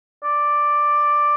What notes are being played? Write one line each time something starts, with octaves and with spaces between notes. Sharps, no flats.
D5